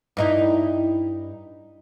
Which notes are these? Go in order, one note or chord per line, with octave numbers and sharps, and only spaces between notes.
G2 D#4 E4